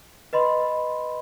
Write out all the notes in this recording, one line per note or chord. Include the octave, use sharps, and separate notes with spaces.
B4 D#5 B5 C6